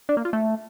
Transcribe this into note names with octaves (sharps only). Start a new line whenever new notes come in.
D4
A#3
F4
A3